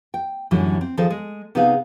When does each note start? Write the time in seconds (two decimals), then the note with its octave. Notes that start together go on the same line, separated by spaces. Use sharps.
0.14 G5
0.51 F#2 A2 D3 E3 F#3 G3
0.81 C4
0.97 D#3 F3 G#4 A4 C5
1.10 G#3
1.55 C3 B3 D#4 G#4 F5